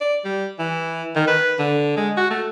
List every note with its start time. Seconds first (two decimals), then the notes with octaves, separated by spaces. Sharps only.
0.01 D5
0.25 G3
0.59 E3
1.16 D#3
1.27 B4
1.59 D3
1.97 G#3
2.18 F#4
2.31 A3